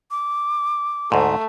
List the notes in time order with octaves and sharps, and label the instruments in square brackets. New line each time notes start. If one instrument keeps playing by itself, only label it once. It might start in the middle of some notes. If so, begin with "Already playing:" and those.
[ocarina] D6
[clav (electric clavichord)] D2 G#2 [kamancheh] A3